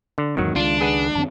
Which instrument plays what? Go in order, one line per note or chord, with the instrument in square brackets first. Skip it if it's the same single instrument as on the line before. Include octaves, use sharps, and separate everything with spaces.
[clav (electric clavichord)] D3
[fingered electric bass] E2 G#2 C4 [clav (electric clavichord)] D#3 F#3
[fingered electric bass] C#2 D#3 G#3 [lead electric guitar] D4 [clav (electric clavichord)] F4
[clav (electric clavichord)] G#4 B4 F#5
[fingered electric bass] F#2 D#3 C4 [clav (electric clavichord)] A5